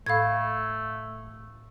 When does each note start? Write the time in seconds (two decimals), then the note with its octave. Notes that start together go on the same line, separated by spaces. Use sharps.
0.06 A2 A3 A4 F5 B5 G#6